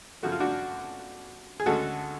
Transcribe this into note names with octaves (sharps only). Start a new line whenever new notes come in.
F#2 C#3 F3 A3 F#4
F4
D4 F#4
G#4
D2 D3 G#3 C#4 F#4 A4